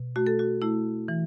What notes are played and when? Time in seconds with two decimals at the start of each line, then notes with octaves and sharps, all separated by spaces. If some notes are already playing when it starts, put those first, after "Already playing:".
Already playing: B2
0.16 A3 F#4
0.27 A4
0.39 F#4
0.62 A3 E4
1.08 E3